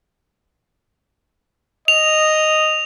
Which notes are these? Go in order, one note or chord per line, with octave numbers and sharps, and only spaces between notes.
D#5 F7